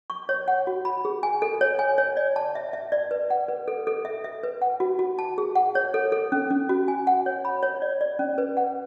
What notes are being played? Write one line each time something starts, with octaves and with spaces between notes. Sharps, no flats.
C#6
C#5
F#5
F#4
B5
G#4
G#5
A4
C#5
G#5
C#5
D5
A5
E5
E5
D5
B4
F#5
B4
A4
A4
E5
E5
B4
F#5
F#4
F#4
A5
G#4
F#5
C#5
A4
A4
C#4
C#4
F#4
G#5
F#5
C#5
B5
C#5
D5
D5
C#4
B4
F#5